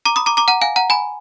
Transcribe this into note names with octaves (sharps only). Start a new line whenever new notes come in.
A#5 D6
B5 D#6
A#5 D6
A#5 D6
F#5 A#5
F5 G#5
F#5 A#5
G#5 B5